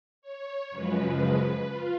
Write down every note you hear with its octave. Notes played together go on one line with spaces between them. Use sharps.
C#5
F#2 C#3 F3 G#3 B4
F4